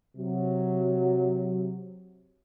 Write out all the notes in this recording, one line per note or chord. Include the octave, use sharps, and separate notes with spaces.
C3 F#3